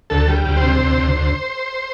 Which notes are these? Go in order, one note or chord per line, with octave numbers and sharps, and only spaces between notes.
D2 A4
G3
D2
C5
C3
D2
D2
D2